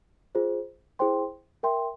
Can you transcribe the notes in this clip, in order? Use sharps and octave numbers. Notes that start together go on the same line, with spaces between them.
F4 G#4 C5
E4 G#4 C5 G5 C6
A#4 E5 G5 C6